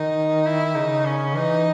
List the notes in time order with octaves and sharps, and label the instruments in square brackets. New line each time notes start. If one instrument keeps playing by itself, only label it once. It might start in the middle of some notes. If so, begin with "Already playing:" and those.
Already playing: [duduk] D#3 [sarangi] D#4
[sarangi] E4
[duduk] C#3 [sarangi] D#4
[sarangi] C#4
[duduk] E3 [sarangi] D#4